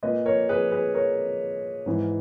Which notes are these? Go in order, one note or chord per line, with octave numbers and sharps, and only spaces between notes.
A#2 A#3 B4 D#5
A#4 C#5
G#4 B4
G#4 B4
A#4 C#5
G#2 E3 B3